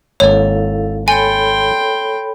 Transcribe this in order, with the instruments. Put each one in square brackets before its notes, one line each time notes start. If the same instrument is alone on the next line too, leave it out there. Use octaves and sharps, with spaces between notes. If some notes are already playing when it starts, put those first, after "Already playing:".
[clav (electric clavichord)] G#1 A#3 [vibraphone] E4 A4 F5 [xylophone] C#5
[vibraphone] A4 C#5 B5 [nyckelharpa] G5 C6 [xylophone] G#5